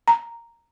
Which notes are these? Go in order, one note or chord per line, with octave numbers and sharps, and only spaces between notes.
A#5